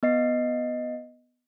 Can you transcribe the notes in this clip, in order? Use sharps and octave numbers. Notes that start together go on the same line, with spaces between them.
B3 D#5 C7